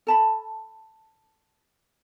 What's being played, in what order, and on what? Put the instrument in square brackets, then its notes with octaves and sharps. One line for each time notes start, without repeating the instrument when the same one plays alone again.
[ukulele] A4 A5 B5